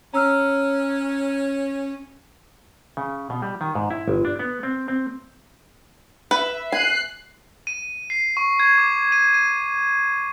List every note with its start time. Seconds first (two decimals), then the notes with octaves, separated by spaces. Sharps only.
0.14 C#4 A#5 E6 F6
2.97 C#3
3.30 B2
3.42 G3
3.61 D#3
3.75 G#2
3.90 E4
4.08 G1
4.25 D4
4.39 B3
4.63 C4
4.88 C4
6.31 B4 E5
6.72 G#5 F#6 C7
7.67 D#7
8.10 C7
8.37 C#6
8.60 G#6
8.78 D6
9.12 D#7
9.34 D#7